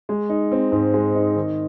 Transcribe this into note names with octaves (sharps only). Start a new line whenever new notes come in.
G#3
D#4
C4
G#2
G#3
D#4
D#3